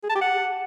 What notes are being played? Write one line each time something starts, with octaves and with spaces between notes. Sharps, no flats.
G#4
A5
G4
F#5